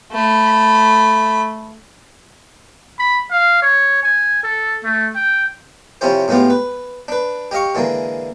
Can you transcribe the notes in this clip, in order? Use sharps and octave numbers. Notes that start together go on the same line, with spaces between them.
A3 B5
B5
F5
C#5
G#5
A4
A3
G5
C3 F3 C#4 E4 G4 C5
A2 G#3 B3 F4 G4
B4
D4 B4
G4 D#5 F5 C#6
D3 E3 G#3 A#3